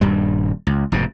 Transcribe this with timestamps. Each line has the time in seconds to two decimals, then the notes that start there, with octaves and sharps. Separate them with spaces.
0.01 D#1 G2 G3
0.67 C#2
0.92 F1 G#2 B2